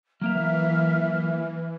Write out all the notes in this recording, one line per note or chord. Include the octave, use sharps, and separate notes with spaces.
E3 F#3 A#3 E5 F5 F6